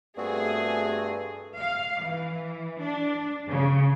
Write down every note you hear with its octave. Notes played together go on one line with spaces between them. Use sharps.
G2 A3 B3 C4 F#4 G#4
F5
E3
D4
C#3